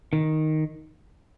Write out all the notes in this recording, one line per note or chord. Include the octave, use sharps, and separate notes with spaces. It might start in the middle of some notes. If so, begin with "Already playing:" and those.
D#3